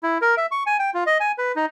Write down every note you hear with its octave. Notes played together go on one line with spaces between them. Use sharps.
E4
A#4
E5
C#6
G#5
G5
F4
D#5
G#5
B4
D#4